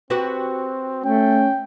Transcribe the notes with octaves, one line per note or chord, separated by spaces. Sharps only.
C4 F#4 G4 B4
A3 C#4 G5